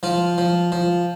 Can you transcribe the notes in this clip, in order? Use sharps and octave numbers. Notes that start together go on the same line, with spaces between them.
F3 F4
F3
F3